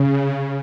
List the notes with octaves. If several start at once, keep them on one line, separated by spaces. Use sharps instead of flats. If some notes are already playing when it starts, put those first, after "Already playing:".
Already playing: C#3